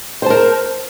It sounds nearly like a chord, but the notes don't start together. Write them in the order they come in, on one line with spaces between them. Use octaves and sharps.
C5 A5 A#4